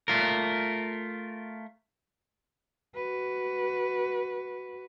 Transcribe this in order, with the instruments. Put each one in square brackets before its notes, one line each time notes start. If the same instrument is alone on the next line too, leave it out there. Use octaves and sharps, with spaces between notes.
[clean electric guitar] A3 F4 A#4
[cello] F#4 B4